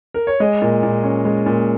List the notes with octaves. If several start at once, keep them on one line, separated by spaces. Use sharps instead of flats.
A#4
C#5
G#3 D#5
A#2
A#2
C#4
G#3
A#2